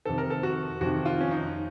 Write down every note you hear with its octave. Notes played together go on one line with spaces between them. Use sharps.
F2 C3 D#3 A4
A#4
A4
F#4
F2 C3 D#3 F#4
F4
C#4
D#4